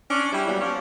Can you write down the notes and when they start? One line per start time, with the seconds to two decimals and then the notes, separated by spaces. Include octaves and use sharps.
0.10 C#4 D4
0.32 G3 E4
0.47 A#2 F#3 G3 B3
0.61 F3 C#4 D4